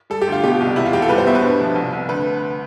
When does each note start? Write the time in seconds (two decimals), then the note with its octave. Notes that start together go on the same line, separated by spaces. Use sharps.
0.10 G3 A4
0.22 G4
0.28 D2 F4
0.43 B2 G4
0.60 C2
0.76 E2 E4
0.86 F4
0.93 E2 G4
1.02 A4
1.09 G3 B4
1.18 C5
1.26 B2 E5
1.35 B4
1.42 G2
1.60 F3
1.75 C2
1.93 C2
2.09 D2 B4